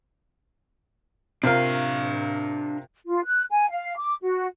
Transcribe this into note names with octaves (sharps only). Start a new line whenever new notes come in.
C3 D4 F4 A#4 F5
F4
F#6
G#5
F5
D6
F#4